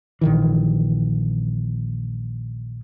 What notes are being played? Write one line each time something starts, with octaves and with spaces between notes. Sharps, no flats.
A#1 D#3 E3